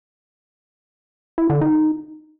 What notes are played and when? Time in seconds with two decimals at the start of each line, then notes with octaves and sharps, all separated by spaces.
1.38 E4
1.50 D3
1.61 D#4